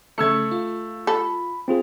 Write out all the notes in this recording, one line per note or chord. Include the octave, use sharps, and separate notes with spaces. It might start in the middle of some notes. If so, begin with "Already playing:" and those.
C#3 A3 C#6 E6 G#6 C#7
F4
A4 B5
C4 F4 G#4